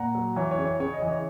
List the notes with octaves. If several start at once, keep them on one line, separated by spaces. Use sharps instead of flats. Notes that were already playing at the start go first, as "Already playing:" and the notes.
Already playing: A#2 F#5 A#5
F#3
E3 C#5
C#5
C#3
C#5
C#3 C#5
D#5
E3
C#5